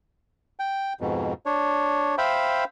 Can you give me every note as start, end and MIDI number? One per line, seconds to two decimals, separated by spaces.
0.60 0.93 79
1.01 1.33 41
1.01 1.33 44
1.01 1.33 47
1.46 2.15 62
1.46 2.15 73
2.18 2.64 72
2.18 2.64 76
2.18 2.64 77
2.18 2.64 79
2.18 2.64 83